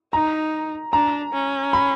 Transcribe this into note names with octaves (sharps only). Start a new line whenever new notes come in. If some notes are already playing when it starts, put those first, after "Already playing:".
D#4 A#5
D4 A#5
C#4
B5